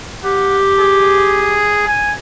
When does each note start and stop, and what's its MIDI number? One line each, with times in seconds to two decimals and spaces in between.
0.23 1.63 67
0.23 0.58 78
0.78 1.84 68
1.87 2.14 80